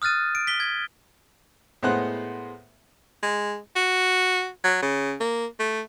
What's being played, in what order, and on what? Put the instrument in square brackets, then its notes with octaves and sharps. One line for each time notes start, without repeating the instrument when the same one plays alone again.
[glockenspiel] D#6 F6 F#6 A6 D#7
D7
B6 G7
G#6
[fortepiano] A2 G#3 B3 C5 F#5 F#6
[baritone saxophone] G#3
F#4
F#3
C#3
A#3
A3